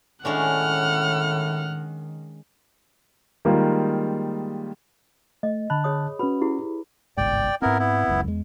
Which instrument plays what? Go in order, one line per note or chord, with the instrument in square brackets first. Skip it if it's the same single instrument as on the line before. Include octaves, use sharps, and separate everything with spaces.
[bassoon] A2 [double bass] D#3 [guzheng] G#3 C#4 D4 [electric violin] F#5 F6
[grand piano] D#3 G3 G#3 A#3 D#4 F4
[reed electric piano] A3 [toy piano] D#5
[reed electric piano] D3 A5 F#6 [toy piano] B5
[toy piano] G#4 C#5 D#6
[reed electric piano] C#4 F#4 [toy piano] B4 B5
[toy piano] E4 G4 G#4
[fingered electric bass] G1 C2 G#2 [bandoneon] D5 G5
[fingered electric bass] G#2 C4 [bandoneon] B3 E4 A#4
[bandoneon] B3 E4
[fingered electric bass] F#1 C#2 F#2
E2 G#3